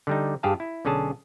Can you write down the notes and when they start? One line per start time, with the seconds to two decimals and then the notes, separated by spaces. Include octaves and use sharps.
0.07 D3 G3 D#4
0.43 G2 G4 G#4 F5 A5
0.60 E4
0.85 B1 D3 C#4 G#4 A5